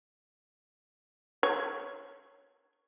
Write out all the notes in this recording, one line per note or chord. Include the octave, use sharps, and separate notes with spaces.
C#5